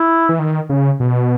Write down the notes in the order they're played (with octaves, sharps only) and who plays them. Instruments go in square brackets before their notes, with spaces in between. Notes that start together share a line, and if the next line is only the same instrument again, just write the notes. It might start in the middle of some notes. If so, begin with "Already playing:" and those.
Already playing: [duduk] E4
[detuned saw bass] E3
D#3
C#3
B2